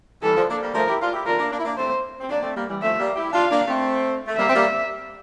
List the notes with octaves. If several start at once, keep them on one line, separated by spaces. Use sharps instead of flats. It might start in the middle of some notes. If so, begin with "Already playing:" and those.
E3 G3 A4
D3 F3
A#3 D4
G3 A#3
F3 A3 A#4
E4 G4
D4 F4
E4 G4
D4 F4 A#4
A#3 D4
A#3 D4
E4
A#3 D4
A3 C4 C5
C4
A#3 D4 D5
A3 C4
G3 A#3
E3 G3
F3 A3 E5
G3 A#3
E4 G4
D4 F4 F5
A#3 D4
A3 C4
A3
G3 A#3 E5
C4
G3 A#3